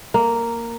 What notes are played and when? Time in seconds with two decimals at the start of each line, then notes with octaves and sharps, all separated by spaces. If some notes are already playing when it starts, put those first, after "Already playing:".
0.14 A#3